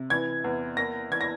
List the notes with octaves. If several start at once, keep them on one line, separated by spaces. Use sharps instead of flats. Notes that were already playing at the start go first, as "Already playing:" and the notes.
Already playing: C3
E3 G#6
E2
A#3 A#6
E3 G#6
A#6